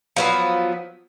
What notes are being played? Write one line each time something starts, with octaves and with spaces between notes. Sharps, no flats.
F3 F#3 B3